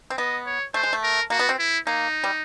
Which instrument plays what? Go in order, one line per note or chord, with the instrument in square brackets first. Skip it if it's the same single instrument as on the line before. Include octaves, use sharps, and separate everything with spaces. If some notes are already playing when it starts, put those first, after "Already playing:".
[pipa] C4
[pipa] B3 [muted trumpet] D#5
[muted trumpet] C#5
[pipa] A3 [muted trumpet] C5
[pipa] G#3
A3
[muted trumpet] A#4
[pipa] A#3 [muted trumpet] F#4
[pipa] B3
C4
[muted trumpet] E4
[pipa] A#3 [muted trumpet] D#4
[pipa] G3